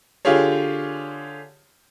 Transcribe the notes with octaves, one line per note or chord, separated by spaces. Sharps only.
D3 F4 G4 G#4 C#5